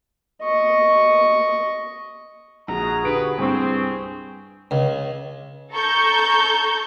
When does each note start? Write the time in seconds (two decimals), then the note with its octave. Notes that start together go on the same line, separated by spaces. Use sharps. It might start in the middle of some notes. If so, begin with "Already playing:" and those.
0.43 D#5 C#6
2.68 A#1 F#4 G#4 A#5
3.05 D3 G4 B4 D7
3.38 C2 G2 C4 G#4 C#6
4.71 C#2
5.71 A4 A#5 C#6 G6